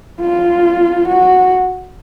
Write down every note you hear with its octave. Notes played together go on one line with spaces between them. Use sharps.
F4
F#4